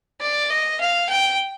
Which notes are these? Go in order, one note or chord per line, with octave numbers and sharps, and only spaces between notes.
D5
D#5
F5
G5